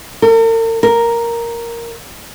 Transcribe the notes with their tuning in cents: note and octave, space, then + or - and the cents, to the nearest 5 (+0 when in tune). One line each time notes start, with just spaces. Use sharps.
A#4 -45
A#4 +0